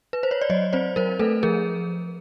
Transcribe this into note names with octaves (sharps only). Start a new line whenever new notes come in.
B4
C5
C#5
D5
F#3 C#5 D#5
C4 C5 D5
F#3 A#4 C5
A3 A4 B4
F3 G#4 A#4